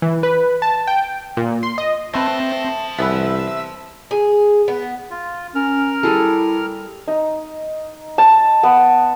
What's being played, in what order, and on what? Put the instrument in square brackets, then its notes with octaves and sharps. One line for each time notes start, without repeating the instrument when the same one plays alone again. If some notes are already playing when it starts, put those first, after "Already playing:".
[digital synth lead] E3
B4
A5
G5
A#2
C6
D#5
[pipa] A3 B4 [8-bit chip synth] C4 C6 A#6 [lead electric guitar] C5 A5
[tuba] C2 [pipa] B3 G#4 B4 [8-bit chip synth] E5 E6
[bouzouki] G#4
B3
[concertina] F4
[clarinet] C#4 [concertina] A#4 F6
[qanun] G3 G#4 A4 [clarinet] E4
[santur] D#4
A5
B3